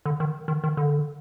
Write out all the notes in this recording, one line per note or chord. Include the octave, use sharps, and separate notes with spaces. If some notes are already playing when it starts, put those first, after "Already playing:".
D3
D#3
D#3
D#3
D3